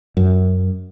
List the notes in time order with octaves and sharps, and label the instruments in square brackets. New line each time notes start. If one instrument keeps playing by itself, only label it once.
[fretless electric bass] F#2